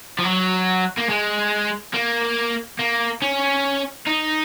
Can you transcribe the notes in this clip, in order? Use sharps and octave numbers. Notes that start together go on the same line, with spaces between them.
F3
F#3
A#3
G#3
A#3
A#3
C#4
D#4